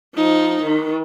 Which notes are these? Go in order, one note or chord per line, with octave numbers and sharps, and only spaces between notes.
F3 D#4
D#3